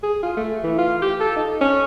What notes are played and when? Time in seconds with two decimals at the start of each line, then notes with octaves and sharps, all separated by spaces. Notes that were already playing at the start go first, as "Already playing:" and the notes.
0.03 G#4
0.23 F4
0.37 A3
0.64 E3
0.78 F4
1.02 G4
1.20 A4
1.36 D#4
1.61 C#4